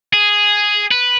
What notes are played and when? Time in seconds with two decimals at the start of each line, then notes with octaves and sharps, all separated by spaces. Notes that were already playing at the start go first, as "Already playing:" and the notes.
0.13 G#4
0.91 B4